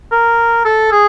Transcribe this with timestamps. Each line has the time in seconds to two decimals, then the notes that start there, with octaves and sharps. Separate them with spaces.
0.12 A#4
0.65 A4
0.92 G#4